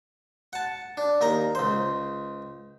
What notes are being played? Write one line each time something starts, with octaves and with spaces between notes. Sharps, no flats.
F#5 A5
D4
D#2 A#4 D#5 A#5
C#2 C5